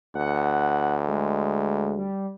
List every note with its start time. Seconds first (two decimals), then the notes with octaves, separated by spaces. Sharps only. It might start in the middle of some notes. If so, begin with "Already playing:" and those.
0.15 D2 F#5
1.08 G#3
1.98 G3